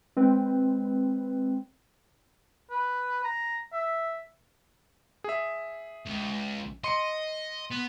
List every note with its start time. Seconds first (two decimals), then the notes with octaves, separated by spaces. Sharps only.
0.17 G#3 C4 B4
2.71 B4
3.24 A#5
3.73 E5
5.24 G#4 E5
6.06 C#2
6.84 D#5 C6 C#7
7.71 B3